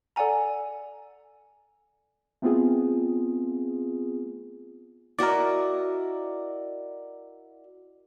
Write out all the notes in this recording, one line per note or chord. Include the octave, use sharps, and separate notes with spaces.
A4 D5 F#5 G#5 A#5
A3 B3 C4 F4 G#4
E4 F#4 A#4 D5 D#5